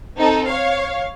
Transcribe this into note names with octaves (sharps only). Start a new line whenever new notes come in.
C4 D#4 A4
C#5 F5